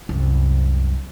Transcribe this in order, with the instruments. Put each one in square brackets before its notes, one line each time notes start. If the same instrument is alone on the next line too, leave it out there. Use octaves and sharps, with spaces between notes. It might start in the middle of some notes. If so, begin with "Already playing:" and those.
[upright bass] C2 F#2